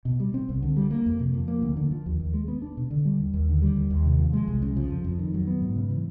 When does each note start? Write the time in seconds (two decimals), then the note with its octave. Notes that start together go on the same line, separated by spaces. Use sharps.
0.05 B2
0.20 G3
0.34 C4
0.49 C2
0.62 D3
0.77 G3
0.91 A#3
1.06 F2
1.19 C3
1.34 F3
1.48 A#3
1.62 D2
1.77 D3
1.91 F3
2.06 D#2
2.20 D#2
2.34 G#3
2.48 B3
2.62 D4
2.77 B2
2.90 D3
3.05 G3
3.20 D#2
3.34 D#2
3.49 D3
3.62 G3
3.76 D#2
3.90 D#2
4.05 C3
4.19 F3
4.33 G#3
4.48 C2
4.62 C#3
4.76 F3
4.90 F2
5.04 F2
5.19 D#3
5.34 F#3
5.47 B3
5.61 G#2
5.76 C#3
5.90 E3